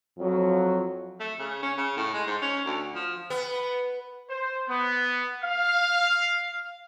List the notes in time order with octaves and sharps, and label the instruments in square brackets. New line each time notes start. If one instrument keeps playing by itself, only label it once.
[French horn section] F2 F3 F#3
[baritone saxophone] A3
C#3
C#4
C#3
A2
G#3
G#2
C#4
D2
F3
[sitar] B3
[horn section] C5
B3
F5